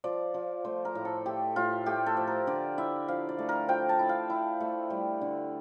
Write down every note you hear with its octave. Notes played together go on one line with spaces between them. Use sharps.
F3 D5
F3
A3 C5
A#4
A2
A4
A3 G4
A2 F4
A3 G4
A4
F3
A#4
D3 D5
E4 E5
F3 F5
D5
A3
A#4
F3 G5
A5
E4
F5
E4
A3
G3
D3